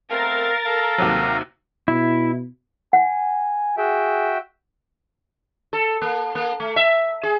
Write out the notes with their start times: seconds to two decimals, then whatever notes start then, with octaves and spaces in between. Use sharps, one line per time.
0.11 A3 B3 C4 A#4 F5 A6
0.65 A4 F5 A#5
0.98 D#2 C3 F#3
1.88 B2 E4
2.93 F#5 G#5
3.77 F#4 G#4 E5 G5
5.73 A4
6.02 A#3
6.35 A#3
6.60 A3
6.76 E5
7.23 G#4